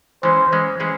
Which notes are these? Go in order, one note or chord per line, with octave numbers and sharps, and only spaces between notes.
E3 G#3 C#4 C5
E3 G#3 C#4
E3 G#3 C#4 E4 G#4